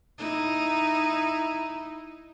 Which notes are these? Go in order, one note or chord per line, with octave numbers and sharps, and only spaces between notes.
D#4 E4